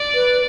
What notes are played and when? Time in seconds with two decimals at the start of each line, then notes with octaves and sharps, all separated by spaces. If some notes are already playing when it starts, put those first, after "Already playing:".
Already playing: D5
0.15 B4